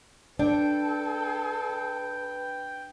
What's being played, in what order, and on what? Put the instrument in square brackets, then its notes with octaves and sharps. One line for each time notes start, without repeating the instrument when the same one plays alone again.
[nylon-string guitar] D4 [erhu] A4 [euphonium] B4 [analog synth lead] G5